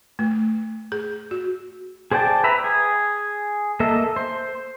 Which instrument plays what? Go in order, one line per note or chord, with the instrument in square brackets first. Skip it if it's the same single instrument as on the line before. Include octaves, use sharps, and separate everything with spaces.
[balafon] A3
G#4
F#4
[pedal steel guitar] G#4 C5 D5 G5 A5
B4 E5 A#5 B5
G#4
A#3 A4 D#5 E5
C5